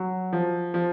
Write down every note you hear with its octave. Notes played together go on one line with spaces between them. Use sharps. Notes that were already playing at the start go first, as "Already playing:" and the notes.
Already playing: F#3
F3
F3